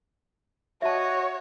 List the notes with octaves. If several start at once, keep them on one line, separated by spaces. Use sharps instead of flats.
F#4 C#5 D#5 E5 A5